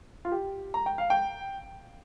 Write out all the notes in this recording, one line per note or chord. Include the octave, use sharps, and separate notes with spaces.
F4
G4
A#5
G5
F5
G5